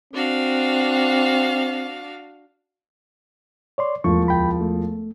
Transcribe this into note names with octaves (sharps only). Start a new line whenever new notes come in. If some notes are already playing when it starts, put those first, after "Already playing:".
C4 D4 F#4 F5
C#5 D5 C6
E1 E2 F3 A3 C#6
D2 G5 B5
A3